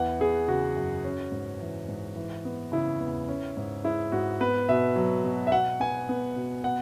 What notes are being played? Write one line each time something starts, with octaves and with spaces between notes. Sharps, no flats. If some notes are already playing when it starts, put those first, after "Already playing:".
Already playing: E2 E3 F#5
B3 G#4
C#3 F#4
F#2
C#4
G#2
E3
G#2
E3
B3
C#3 E4
E2
C#4
G#2
G#3 E4
G#2 F#4
B3 B4
B2 E5
F#3
B2
E5
B2 F#5
B3 G#5
B3
B2
B3 F#5